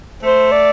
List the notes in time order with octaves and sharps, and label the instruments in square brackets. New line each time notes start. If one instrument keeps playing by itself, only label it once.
[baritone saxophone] A3 [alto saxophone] C5
[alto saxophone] D5